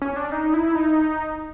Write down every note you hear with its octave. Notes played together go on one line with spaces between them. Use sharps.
C#4
D4
D#4
E4
D#4